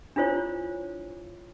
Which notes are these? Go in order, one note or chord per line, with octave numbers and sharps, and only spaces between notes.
D4 E4 F4 C5 C#5